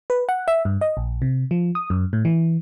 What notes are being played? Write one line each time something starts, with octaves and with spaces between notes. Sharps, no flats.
B4
F#5
E5
G2
D#5
A#1
C3
F3
D#6
F#2
A2
E3